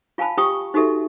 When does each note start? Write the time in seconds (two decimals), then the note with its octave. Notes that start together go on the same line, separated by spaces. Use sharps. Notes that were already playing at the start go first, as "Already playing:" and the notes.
0.18 F4 F5 G#5 A5 B5
0.37 F4 G4 G5 C#6 D#6
0.74 D#4 F#4 G4 A4 E5